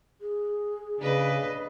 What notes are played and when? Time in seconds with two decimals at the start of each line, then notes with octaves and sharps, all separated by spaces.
0.21 G#4
1.00 C#3 D4 B4 D#5